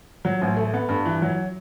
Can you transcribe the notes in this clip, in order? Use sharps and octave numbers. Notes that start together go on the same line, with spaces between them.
F#3
A1
A3
B3
G2
E3
F#3